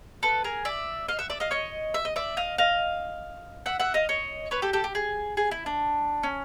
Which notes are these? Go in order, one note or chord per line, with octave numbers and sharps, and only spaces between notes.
A4 B4
G#4 A#4
D5 E5
D#5 F5
E5 F#5
D5 E5
D#5 F5
C#5 D#5
E5
D#5
D5 E5
D#5 F5
D#5 F5
E5 F#5
E5 F#5
D#5 F5
C#5 D#5
B4 C#5
G4 A4
G4 A4
G4
G#4
G#4
E4
D4
C#4